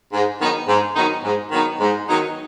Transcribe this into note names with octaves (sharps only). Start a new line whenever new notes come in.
G#2
D#3 F#3 B3 D#4
G#2
D#3 F#3 B3 D#4
G#2
D#3 F#3 B3 D#4
G#2
D#3 F#3 B3 D#4